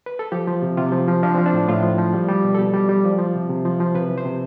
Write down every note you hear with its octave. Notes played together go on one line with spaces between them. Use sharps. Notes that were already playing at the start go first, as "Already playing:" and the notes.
B4
A4
F3 G4
F3
C3
C3 F4
F3
F3
F3 D4
F3 C4
D4
A2
A2 F4
F3
F3
G3
G3
B2
A4
B2 G4
G3
G3
F3
F3
C3
C3
F3
F3
C3 B4
E3
C5
C3